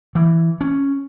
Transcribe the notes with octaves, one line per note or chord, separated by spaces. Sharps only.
E3
C#4